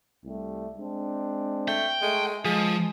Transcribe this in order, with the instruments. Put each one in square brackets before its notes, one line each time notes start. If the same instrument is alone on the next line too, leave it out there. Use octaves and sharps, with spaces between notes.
[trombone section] C2 G3 A3
G#3 C4 D4
[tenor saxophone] A3 [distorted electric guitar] G5
[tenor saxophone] G#3 [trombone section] A3
[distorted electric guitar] F3 [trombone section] G#3 [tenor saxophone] G#4